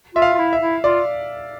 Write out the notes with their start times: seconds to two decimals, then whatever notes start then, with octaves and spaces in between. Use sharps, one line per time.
0.15 F4 E5
0.22 F5
0.34 F4
0.38 E4
0.53 E5
0.61 E4
0.83 F4 D5